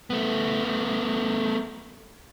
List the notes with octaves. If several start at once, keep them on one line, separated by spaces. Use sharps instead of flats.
A3 B3